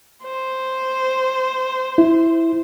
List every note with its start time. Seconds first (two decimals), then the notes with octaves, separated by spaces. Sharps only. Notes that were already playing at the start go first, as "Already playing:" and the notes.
0.24 C5
1.98 E4